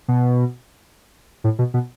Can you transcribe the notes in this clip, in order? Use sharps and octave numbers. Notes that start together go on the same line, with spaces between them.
B2
A2
B2
B2